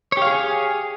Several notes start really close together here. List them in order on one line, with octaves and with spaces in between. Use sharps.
C#5 G4 F5 G#4 G#5